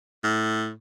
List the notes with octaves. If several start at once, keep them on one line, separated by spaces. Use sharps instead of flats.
A2